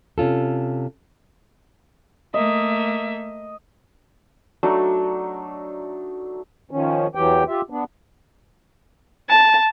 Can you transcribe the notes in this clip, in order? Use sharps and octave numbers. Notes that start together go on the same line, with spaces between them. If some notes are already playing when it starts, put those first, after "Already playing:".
C3 C#4 F4 A4
A3 A#3 D#5 E5
F#3 A3 D4 D#4
D#3 F3 C#4
E2 E3 F#3 G4 G5
F4 G4 E5
B3 D4
A5